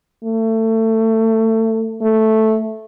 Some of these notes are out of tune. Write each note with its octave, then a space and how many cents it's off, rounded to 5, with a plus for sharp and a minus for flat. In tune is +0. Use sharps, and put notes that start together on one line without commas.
A3 +25
A3 -5